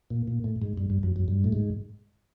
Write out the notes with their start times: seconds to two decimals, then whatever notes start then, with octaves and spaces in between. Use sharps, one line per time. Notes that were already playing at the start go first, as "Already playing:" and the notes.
0.10 A#2
0.28 A#2
0.44 A2
0.62 G#2
0.77 G2
0.90 G2
1.03 F#2
1.16 F#2
1.28 G2
1.44 A2
1.52 G#2